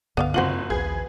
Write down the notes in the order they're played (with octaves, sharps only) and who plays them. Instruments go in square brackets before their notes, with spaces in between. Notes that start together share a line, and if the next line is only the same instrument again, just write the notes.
[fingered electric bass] C2 G2 D3 [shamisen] B3 D5 F5
[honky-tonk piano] F#1 F#7 [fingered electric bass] F#2 C4 [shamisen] F4 F#4 C5
[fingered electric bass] A#1 D#2 [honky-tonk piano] G#4 B4 G#6